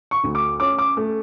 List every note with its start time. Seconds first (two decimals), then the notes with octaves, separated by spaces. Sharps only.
0.11 C#6
0.24 D2
0.35 D6
0.60 C#4 D6
0.78 D6
0.97 A3